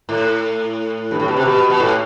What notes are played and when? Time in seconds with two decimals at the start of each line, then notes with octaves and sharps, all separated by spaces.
0.09 A2
1.11 G2
1.20 A2
1.28 B2
1.36 C3
1.45 B2
1.70 B2
1.80 A2